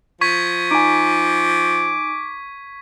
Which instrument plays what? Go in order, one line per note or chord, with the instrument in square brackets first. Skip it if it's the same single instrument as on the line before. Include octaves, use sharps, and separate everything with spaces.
[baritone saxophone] F3 [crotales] C#6 G#6 B6
[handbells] D#4 G#5 [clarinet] D6